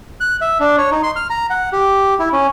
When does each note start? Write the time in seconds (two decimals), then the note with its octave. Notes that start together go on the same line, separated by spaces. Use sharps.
0.20 F#6
0.41 E5
0.60 D4
0.78 C#5
0.91 D#4
1.03 C6
1.16 F6
1.30 A#5
1.50 F#5
1.73 G4
2.19 E4
2.33 C#4